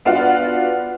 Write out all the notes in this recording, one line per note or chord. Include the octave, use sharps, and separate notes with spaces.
B3 D4 F4 F#4 F5